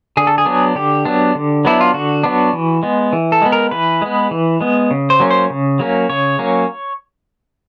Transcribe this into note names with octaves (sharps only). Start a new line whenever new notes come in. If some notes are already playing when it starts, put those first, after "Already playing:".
D3 G#4
A4
G#4
F#3 B3 D4
D3 G4
F#3 B3 D4
D3
F#3 B3 D4 E4
F4
D3 F#4
F#3 B3 D4
E3
G#3 B3
E3
A4
G#3 B3
A#4
E3 B4
G#3 B3
E3
G#3 B3
C#3
C5
F#3 A#3 C#4
C5
C#3
F#3 A#3 C#4
C#3 C#5
F#3 A#3 C#4